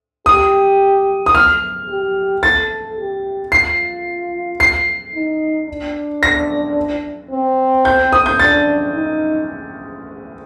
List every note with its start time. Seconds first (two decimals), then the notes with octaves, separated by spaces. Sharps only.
0.26 G4 D#6
1.26 D#6
1.35 F6
1.89 G4
2.43 A4 A6
2.97 G4
3.52 F4 C7
4.60 C7
5.14 D#4
5.68 D4
6.23 A#6
7.31 C4
7.85 G6
8.13 D#6
8.26 G6
8.39 D4 A6
8.94 D#4